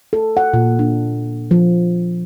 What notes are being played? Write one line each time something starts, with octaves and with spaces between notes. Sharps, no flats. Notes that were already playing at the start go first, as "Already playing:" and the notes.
A4
F#5
A#2
D4
F3